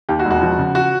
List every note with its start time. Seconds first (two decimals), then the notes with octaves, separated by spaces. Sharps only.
0.09 D#2 G4
0.19 F#4
0.25 E1
0.30 F#4
0.42 F3
0.58 C#3
0.75 F#4